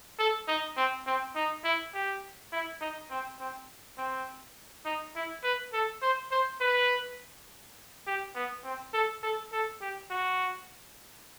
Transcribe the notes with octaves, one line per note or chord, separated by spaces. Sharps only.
A4
D#4
C4
C4
D#4
E4
G4
E4
D#4
C4
C4
C4
D#4
E4
B4
A4
C5
C5
B4
G4
B3
C4
A4
A4
A4
G4
F#4